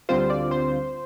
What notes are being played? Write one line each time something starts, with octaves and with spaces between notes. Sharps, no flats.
D2 D3 G3 C4 F4 C5
D5
C5